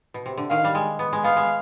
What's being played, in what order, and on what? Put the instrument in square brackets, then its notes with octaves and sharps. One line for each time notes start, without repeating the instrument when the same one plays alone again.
[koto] B2
C3
D3
[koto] D#3 [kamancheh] F5
[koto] G3
G#3
B3
G#3
[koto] B3 [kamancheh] F5
[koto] G#3